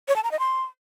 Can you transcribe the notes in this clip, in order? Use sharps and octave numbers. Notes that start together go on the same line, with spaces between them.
C#5
A5
A#5
D#5
C6